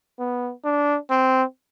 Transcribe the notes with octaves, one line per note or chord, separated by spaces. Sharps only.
B3
D4
C4